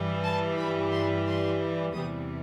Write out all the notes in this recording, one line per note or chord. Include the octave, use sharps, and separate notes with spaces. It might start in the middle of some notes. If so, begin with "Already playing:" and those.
Already playing: G2 E3 G3
A5
B5
C6
C6
E2 C3 E3 G3 D#6